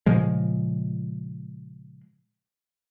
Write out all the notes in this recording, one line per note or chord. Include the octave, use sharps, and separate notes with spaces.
A#2 C#3 F3 G#3